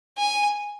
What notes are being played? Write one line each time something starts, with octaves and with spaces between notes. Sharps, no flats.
G#5